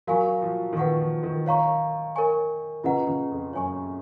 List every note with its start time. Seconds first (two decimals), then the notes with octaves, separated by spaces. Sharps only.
0.07 F#3 F#4 A#4 F5 G#5 C#6
0.42 F3
0.73 D#3
0.77 F3 B4 F#5 C#6
1.00 F3
1.23 D#3
1.46 C#5 F5 A#5 C#6
2.16 A#4 C#5 G#5 C#6
2.84 C#3 F4 B4 D#5 F#5 A#5
3.07 C#3
3.31 F2
3.53 F#2 C#5 G#5 C#6